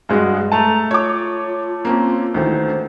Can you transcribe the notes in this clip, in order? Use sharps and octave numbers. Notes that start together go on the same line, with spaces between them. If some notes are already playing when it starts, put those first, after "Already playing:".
G2 G#3 F#4 G#4
A3 A5 A#5
F4 C#5 D6
A#3 C4 C#4
D2 D#3 E3 C5